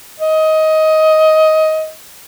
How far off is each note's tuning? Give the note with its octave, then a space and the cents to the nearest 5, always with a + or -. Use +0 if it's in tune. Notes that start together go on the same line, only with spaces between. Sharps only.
D#5 +15